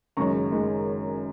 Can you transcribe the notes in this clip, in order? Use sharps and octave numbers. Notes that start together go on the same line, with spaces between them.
F#1 F#2 D#3 G#3 A#5 C#6
D#3 G#3